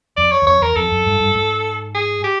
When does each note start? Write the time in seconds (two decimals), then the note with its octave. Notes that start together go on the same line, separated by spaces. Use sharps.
0.17 F2 D5
0.32 C#5
0.42 E2
0.47 F2 C#5
0.61 E2 A#4
0.76 F2 A4
0.92 F#2
1.06 G2
1.20 G2
1.35 G#2
1.95 G#4
2.24 G4